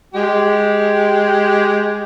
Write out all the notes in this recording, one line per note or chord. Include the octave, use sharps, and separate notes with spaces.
G#3 G4